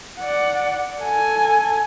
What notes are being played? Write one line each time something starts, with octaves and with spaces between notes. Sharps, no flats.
D5 F#5
A4 G#5